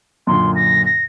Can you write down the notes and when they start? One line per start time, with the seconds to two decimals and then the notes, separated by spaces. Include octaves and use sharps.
0.27 F#2 A#2 D3 C6
0.55 A#6
0.86 A#6